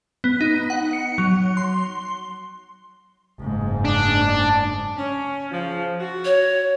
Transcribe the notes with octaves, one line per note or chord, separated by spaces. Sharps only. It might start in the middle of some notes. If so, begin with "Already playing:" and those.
B3
D#4
F#5
C#7
F#3
C6
F#1 G#2
D4
C#4
C#3 F3
F#4
C#5